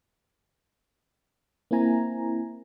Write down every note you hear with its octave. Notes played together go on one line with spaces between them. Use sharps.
A#3 C4 E4 G#5 A#5